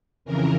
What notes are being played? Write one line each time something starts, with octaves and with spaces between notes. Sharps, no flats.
F2 C#3 E3 A#4